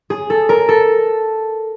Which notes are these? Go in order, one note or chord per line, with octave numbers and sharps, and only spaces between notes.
G#4
A4
A#4
A4